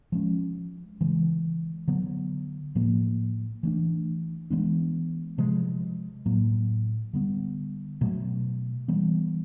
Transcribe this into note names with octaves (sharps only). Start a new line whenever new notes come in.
F3 G#3 C#4
C#3 E3 G#3
D3 F#3 B3
A2 F3 A#3
E3 A3 D4
E3 G#3 B3 D4
C3 F3 G#3
A2 F#3 A#3
D3 G3 B3
B2 F#3 A3
E3 G3 B3